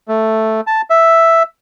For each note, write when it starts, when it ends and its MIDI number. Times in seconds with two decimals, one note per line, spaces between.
0.08 0.61 57
0.67 0.81 81
0.90 1.43 76